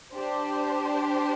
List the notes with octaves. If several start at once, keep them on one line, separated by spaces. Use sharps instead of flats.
D4 G4 C5